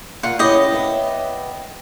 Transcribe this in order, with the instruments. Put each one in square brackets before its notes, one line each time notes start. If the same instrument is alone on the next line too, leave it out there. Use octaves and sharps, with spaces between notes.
[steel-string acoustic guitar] A#2 [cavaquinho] F4 F#5
[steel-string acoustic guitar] C#3 E4 [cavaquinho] G4 D#5
[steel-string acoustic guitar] B3 E5